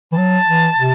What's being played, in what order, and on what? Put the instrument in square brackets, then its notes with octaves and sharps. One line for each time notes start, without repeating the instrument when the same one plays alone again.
[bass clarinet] E3
[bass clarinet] F#3 [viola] A5
[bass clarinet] E3
C3